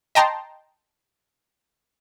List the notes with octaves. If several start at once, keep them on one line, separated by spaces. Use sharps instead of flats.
D#5 G5 A5 A#5 C6